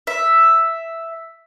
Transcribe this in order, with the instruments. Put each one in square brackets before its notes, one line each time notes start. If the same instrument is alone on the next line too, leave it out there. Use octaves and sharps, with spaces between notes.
[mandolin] E5